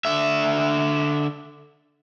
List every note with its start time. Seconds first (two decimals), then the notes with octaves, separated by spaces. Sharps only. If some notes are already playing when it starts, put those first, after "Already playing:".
0.05 D3 E5